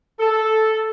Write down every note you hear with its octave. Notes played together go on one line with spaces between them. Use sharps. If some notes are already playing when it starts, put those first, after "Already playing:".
A4